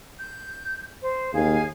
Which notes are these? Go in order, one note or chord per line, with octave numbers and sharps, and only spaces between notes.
G6
C5
D#2 G#4 F5 G#5